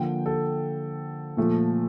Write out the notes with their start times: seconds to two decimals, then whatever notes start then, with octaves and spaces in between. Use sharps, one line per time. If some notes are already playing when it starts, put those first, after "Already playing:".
Already playing: D3 F3 A#3 G5
0.26 A4
1.37 A#2 F3 A3